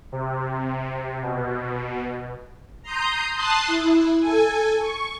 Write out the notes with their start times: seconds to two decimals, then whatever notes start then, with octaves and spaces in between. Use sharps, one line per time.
0.12 C3
1.22 B2
2.82 A#5 C6 D#6 G6
3.34 A5 C6 D#6 F#6 A6 C7
3.67 E4
4.20 A4 G#5
4.79 C#6